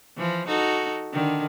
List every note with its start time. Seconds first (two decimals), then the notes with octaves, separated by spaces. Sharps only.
0.18 E3 F3
0.47 D#4 F#4 A4
1.13 D3 D#3